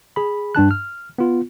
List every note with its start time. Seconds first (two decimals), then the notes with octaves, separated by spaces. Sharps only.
0.16 G#4 B5
0.55 G2 D4 A5 F#6
0.71 F6
1.18 B3 F4